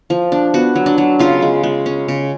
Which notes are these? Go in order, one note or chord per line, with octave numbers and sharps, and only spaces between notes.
F3
D4
B3 F#4
F#3
D4
F#3
C#3 F4
G#3
G#3
C#4
C#3